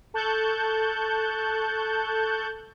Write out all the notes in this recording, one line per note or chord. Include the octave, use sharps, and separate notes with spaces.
A4 A5 C#6 F#6 G6